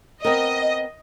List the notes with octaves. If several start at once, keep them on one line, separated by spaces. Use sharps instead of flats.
B3 C4 A#4 D#5